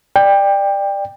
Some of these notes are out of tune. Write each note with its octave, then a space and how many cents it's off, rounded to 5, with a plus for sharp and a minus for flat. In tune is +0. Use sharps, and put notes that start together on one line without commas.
D5 +15 G5 +20